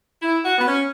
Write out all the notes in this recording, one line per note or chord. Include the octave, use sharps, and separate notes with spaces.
E4
F#4
B3
C#4